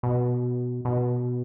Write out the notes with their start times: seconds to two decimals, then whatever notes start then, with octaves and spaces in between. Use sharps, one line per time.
0.03 B2
0.85 B2